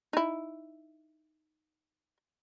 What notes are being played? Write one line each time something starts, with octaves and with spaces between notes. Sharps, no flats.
D#4 E4